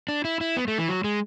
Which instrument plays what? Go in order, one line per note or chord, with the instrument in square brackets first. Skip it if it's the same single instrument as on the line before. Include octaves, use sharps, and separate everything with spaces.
[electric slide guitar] D4
E4
E4
B3
A3
E3
F#3
G#3